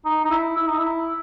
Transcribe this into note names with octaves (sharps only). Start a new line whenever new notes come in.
D#4
D#4
E4
E4
D#4
E4